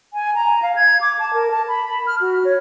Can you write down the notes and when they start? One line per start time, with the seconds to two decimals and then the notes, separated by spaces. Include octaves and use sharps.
0.14 G#5
0.35 A#5
0.62 F5
0.76 G#6
1.01 D6
1.19 A5
1.33 A#4
1.51 A5
1.68 B5
2.07 F6
2.21 F#4
2.45 C#5